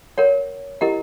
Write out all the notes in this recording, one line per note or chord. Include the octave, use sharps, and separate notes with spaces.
A#4 C#5 F#5
E4 G4 A#4 D#5 F#5